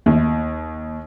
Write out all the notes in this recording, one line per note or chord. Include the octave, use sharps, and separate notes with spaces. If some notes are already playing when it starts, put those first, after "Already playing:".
D#2